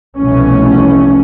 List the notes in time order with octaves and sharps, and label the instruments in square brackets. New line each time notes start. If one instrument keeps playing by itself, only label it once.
[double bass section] F1 C2 B2 E3 A3 C#4